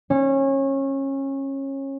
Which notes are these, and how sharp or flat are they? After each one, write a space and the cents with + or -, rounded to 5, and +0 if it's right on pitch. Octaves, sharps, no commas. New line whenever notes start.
C#4 -25